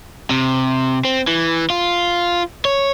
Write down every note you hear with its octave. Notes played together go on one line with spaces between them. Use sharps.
C3
C4
E3
F4
C#5